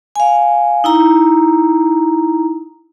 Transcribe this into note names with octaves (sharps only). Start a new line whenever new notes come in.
F5 G#5
D#4 E4 A#5